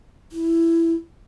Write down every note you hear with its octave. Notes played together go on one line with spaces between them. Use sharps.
E4